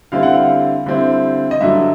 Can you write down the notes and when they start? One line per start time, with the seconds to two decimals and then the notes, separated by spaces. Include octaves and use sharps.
0.12 D3 G3 C4 E4 F5
0.23 F#5
0.33 F5
0.86 D3 G3 C4 E4
1.51 D#5
1.61 G2 D3 F#3 E5